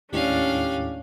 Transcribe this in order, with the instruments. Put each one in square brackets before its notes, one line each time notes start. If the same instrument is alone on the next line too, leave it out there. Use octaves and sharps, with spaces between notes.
[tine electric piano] D#2 A2 G#3 [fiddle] C#4 F5 [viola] D4 [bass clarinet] G4